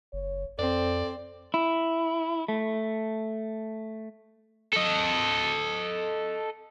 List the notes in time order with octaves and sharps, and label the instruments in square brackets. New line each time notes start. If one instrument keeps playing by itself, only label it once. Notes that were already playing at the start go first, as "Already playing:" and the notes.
[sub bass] F#1 [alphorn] C#5
[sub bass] F2 [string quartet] C4 [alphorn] A4 [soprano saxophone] D5
[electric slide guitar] E4
A3
[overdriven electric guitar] A4 D#5